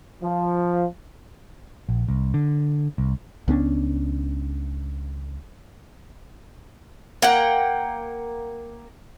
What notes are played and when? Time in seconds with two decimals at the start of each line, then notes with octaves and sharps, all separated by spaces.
0.23 F3
1.89 A#1
2.09 C2
2.34 D3
2.98 C2
3.48 C#2 B3 C#4 D4
7.22 A#3 F#5 G5